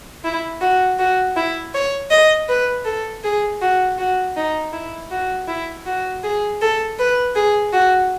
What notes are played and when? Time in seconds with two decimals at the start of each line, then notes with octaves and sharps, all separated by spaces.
0.24 E4
0.60 F#4
0.98 F#4
1.36 E4
1.74 C#5
2.11 D#5
2.48 B4
2.85 A4
3.24 G#4
3.61 F#4
3.98 F#4
4.36 D#4
4.73 E4
5.10 F#4
5.48 E4
5.86 F#4
6.23 G#4
6.61 A4
6.99 B4
7.35 G#4
7.73 F#4